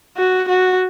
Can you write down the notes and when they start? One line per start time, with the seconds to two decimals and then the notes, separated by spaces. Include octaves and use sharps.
0.17 F#4
0.49 F#4